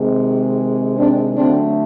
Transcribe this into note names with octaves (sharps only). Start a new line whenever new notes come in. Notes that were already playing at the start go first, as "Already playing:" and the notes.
Already playing: C3 D#3 G#3
C4 D4
D3 F#3 A3 C4 D4